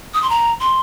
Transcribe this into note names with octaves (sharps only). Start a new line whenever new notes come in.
D#6
C6
A#5
C6